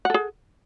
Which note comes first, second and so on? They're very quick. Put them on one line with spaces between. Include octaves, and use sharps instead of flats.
F#5 A4 G#4